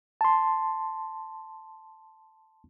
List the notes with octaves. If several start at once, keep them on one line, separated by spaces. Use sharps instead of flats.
A5 C6